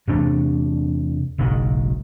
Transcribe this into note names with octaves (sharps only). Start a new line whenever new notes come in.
E2 C3 A3 D4
F#1 B1 G#2 D#3